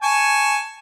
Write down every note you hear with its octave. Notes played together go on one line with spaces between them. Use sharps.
G#5 A5 C#6